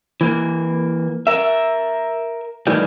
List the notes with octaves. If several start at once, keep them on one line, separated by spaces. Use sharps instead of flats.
E3 A#3
A#4 E5
A2 D#3 E3 G3